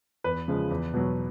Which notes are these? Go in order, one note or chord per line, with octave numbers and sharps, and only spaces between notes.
E2 B4
C#3 F3 G#3
E2
B2 F#3